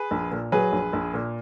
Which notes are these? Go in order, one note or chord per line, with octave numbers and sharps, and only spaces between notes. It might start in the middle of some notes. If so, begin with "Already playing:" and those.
Already playing: G#4 B4
A#1
A#2
F#3 G#4 B4
A#1
A#1
A#2